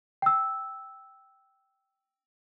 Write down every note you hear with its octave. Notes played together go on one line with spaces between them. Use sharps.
G5 E6